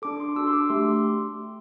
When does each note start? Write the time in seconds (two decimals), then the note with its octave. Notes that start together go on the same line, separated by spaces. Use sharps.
0.02 D4 A4 D6
0.20 C6
0.36 D4 F#4 A4 E6
0.47 C6
0.53 D6
0.70 A3 D4 G4 C6